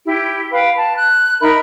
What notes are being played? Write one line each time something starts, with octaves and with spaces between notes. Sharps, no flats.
E4 G4
B4 F5 G5 B5
A5
F#6
D#4 A#4 E5 B5